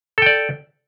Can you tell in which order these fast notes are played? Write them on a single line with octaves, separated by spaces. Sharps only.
A4 G5 D5